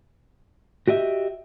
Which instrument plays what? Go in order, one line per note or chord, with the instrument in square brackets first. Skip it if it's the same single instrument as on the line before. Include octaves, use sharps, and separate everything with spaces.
[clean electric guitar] F#4 G4 D#5 E5